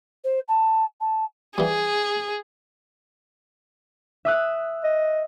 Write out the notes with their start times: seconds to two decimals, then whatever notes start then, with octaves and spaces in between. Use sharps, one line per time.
0.24 C5
0.48 A5
1.00 A5
1.58 E3 G3 G#4
4.25 E5 D#6 F#6
4.84 D#5